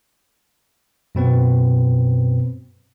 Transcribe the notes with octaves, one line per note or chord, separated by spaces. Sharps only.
F#2 B2 C4 B4